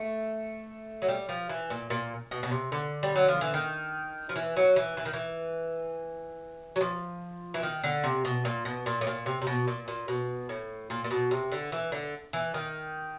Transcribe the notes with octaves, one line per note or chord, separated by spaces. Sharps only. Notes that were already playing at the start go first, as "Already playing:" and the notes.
Already playing: A3
F#3
G3
F3
E3
A#2
A#2
B2
B2
C3
D3
G3
F#3
F3
E3
D#3
F3
E3
F#3
E3
E3
D#3
E3
F#3
F3
E3
D#3
D3
C3
B2
A#2
B2
A#2
A2
A#2
C3
C3
B2
A#2
A#2
B2
A2
A#2
A#2
B2
C3
D3
E3
D3
E3
D#3